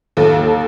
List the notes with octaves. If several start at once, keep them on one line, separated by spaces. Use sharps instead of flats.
D#2 A4